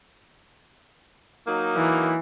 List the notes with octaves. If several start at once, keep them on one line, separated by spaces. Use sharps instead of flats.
F#3 A#3 D#4
E3